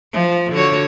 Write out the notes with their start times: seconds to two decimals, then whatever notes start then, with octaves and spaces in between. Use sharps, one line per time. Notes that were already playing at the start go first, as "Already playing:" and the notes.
0.13 F3
0.52 D3 F#4 C#5